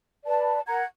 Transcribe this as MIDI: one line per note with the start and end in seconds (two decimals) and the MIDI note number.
0.25 0.61 71
0.25 0.61 74
0.25 0.61 81
0.66 0.83 70
0.66 0.83 78
0.66 0.83 82
0.66 0.83 92